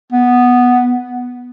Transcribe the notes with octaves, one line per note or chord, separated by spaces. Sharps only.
B3